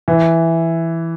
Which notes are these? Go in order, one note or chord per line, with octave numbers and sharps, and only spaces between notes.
E3